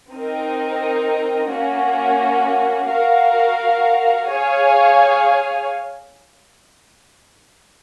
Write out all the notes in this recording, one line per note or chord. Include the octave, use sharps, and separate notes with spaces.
C4 D#4 A#4
A#3 C#4 F#4
F#4 A#4 F5
G#4 C#5 F5 G#5